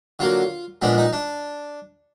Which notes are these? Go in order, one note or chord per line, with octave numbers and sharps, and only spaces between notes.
D3 F#3 A#3 F4
A#2 F3 G#3 B3 D4
D#4
D4